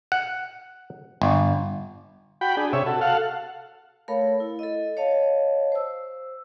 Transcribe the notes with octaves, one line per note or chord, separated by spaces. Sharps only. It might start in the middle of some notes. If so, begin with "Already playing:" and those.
F#5
G1
F#4 G5 B5
D4 G#4
C3 C#5 E5
F#4 A4
A4 F5 F#5
A3 A4 A#4 C#5 F5 B5
E4
A4 D#5
C#5 D#5 F5 A5
C5 E6